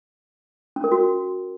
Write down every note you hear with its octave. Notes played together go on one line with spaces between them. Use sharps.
C#4
A#4
F#4